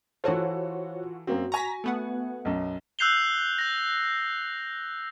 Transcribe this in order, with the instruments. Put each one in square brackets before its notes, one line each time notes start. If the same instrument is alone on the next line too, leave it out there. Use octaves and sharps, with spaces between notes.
[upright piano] E3 A4 [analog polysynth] F4 F#4 F#5 [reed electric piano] C5 C#5
[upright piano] F#2 A#3 C4 [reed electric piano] F#4
[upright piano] G#5 C#6 [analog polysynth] A#5 A#6 B6
[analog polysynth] A3 B3 F#5
[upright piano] B1 F#2
[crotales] E6 F#6 G6 C7 F7 G7
G6 A#6